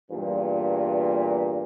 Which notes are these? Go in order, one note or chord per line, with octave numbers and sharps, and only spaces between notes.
E2 G2 A#2